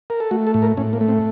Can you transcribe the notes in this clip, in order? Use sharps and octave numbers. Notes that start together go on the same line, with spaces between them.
A#4
A4
A3 F#4
A4
A2
A#4
A2 C#4
A#3
A3
C4